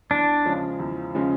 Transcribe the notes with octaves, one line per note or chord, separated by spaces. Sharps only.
E2 D4
C#3 F3 G#3 C#4
E2
C#3 F3 G#3 C#4